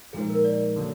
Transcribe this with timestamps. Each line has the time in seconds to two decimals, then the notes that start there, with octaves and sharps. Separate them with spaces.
0.13 A#2 F3 G#3 D#4 G#4
0.29 A#4
0.44 D5
0.76 D3 F#3 A#3